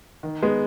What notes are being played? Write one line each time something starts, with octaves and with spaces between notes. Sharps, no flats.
D#3
G#3 B3